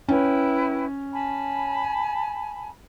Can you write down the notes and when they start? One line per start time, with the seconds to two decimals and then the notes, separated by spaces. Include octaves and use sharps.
0.09 C#4 E4 B4 G5
1.13 G#5 A5 B5